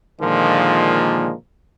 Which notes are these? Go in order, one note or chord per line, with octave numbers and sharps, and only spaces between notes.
A#2 D3 D#3 F3 G#3 A#3